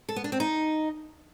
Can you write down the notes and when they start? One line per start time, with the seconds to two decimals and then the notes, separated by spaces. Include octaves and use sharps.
0.09 A4
0.16 B3
0.24 D4
0.32 C4
0.40 D#4